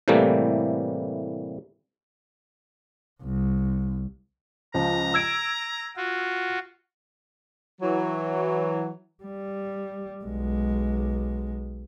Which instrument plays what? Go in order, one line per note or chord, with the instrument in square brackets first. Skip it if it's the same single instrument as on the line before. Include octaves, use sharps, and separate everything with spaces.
[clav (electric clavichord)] A2 C3 E3 G3 A3 A#3
[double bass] C2
[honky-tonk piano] C#2 F3 [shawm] A#5
[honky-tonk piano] E6 G#6 D7
[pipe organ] F4 F#4
[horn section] E3 F#3
[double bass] G3
B1 G#3